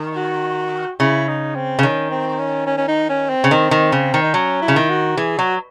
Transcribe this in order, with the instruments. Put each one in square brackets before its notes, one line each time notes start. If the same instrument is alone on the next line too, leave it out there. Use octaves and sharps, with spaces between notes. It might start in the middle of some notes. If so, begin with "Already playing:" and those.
Already playing: [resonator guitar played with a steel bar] D#3
[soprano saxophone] F#4
[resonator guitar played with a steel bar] C#3 [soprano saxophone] E4
[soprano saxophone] D#4
C4
[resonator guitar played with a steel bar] C#3
[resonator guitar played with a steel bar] D#3 [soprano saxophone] C#4
[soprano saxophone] C4
C#4
C#4
C#4
D#4
C#4
C4
[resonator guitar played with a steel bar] C#3
[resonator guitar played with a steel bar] D#3 [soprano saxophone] C4
[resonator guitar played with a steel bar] D#3
C#3
D#3
[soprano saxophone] D#4
[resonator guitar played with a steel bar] F#3 [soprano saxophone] C#4
[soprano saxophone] E4
[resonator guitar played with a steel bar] C#3
D#3
[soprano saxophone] F#4
[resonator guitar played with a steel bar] E3 [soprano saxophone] G#4
[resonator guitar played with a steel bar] F#3 [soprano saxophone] F#4